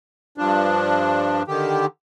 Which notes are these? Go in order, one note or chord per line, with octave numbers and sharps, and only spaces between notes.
G2 F3 D4
D3 D#3 G4